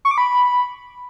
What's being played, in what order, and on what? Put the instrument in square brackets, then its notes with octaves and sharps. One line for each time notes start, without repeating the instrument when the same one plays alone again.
[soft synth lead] C#6
D6
B5